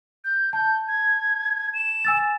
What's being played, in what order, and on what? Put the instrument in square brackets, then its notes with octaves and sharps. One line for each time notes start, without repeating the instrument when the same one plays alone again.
[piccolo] G6
[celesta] A5 [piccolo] G6
[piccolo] G#6
E7
[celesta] G#5 E6 A6